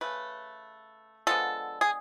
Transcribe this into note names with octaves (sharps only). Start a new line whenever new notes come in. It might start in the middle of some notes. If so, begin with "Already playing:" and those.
C#3 F#3 A3 B4
D3 F3 G#3 B3 A4
G#4